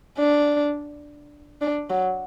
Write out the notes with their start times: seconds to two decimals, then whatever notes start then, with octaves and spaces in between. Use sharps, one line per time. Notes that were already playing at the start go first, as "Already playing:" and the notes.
0.18 D4
1.61 D4
1.90 F#3